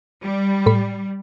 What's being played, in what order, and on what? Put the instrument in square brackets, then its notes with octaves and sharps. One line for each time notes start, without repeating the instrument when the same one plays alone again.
[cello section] G3
[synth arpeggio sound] A2 B5